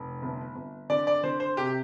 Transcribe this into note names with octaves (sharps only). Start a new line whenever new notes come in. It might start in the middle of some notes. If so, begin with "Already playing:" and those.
Already playing: F1
G1
G1
D3 D5
D5
D3 C5
C5
C3 G4